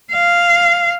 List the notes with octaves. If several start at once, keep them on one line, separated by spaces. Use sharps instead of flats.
F5